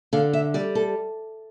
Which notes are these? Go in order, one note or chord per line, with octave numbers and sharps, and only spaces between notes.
D3 F5
E5
G3 D5
A4